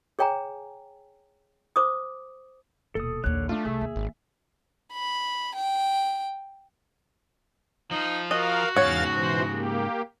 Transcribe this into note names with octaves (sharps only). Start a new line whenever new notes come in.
G#4 C#5 G5 G#5 A#5
C5 D6 D#6
D#1 B2 A4 D#6
A#1 D#2 D3 C#5 F#6
A3 D4 F4
C2 G#4 E5
D#2
G#1
B5
G5
F3 D#4 F4
F#4 A#4 D#5 F5
E2 G#2 C#3 C#5 F5 F#5 A6
B2 E3 C5
A#3 G4